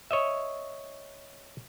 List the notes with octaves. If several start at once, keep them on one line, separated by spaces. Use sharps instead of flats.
C#5 D#5 E5